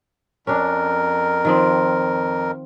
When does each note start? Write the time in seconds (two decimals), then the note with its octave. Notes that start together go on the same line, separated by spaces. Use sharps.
0.47 F2 C#4 D4 A#4
1.45 D#3 F3 C4